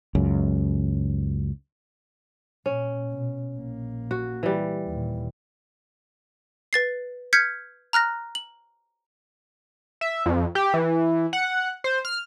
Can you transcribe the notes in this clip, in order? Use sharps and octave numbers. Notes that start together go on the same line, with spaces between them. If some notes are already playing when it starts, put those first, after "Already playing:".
C#2 F#2
A#2 C#4
B2
A#1 A#3
F#4
E3 G3
D#2 A#2
B4 A6 C7
F6 G6 G#6 B6 C#7
A#5 F6 F#6 A#6
F#7
E5
F2
G4
E3
F#5
C5
F6